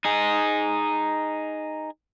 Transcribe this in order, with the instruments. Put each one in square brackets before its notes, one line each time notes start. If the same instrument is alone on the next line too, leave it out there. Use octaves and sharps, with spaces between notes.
[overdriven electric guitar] D#4 G#4